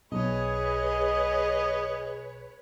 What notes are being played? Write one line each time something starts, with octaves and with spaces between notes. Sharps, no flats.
B1 G#4 B4 C#5 D#5